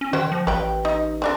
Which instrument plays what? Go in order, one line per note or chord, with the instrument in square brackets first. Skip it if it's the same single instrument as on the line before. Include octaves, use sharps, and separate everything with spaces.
[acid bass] C#4
[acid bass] D#3 [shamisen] F#4 C5 G5
[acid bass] F3
[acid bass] A1 [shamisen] B4 G5
[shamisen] D#4
C4 D4 A#4